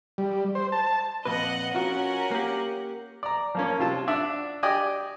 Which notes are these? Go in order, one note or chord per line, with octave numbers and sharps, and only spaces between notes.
G3
C5
A5
F2 A#2 B4 D#5 F#5
C#4 F4 F#4 A#4 F#5
A#3 G4
D5 A#5
F3 A#3 C#4
C3 F4 A5
D4 D5 E5 F#5
G4 D5 D#5 G5 G#5